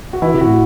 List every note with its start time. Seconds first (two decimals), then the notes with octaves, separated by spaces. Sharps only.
0.13 F#4
0.22 E3 E4
0.34 C3
0.41 F#4
0.46 A2